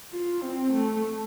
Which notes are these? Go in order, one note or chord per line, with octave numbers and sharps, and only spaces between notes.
F4
C4
A3